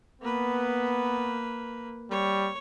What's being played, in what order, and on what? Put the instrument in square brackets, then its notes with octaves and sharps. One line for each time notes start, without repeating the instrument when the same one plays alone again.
[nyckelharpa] A#3 B4 [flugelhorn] B3
[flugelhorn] G3 [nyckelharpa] C#5